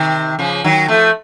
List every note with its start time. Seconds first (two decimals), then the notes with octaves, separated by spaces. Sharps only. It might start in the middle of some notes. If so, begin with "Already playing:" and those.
Already playing: C3 D#3
0.39 C#3 F3
0.64 D#3 F#3
0.88 F3 A3